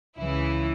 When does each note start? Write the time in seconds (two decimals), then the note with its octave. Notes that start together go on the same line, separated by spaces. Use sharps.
0.18 C#2 C#3 E3 E4